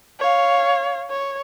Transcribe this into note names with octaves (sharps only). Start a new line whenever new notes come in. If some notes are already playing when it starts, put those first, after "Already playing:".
C#5 F5
C#5